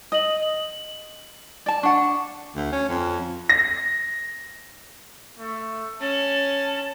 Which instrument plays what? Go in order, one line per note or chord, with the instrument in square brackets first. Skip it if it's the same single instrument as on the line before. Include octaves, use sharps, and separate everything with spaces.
[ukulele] D#5 [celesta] D#6 F#7
[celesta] F#7
[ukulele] D5 A5
[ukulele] D4 F#5 [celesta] C#6
[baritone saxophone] D2
C#4
F2
[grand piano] A#6
[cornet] A3
[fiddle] C#4 [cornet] A5